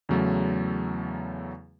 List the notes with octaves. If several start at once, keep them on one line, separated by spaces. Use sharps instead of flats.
E2 C#3 F#3 A3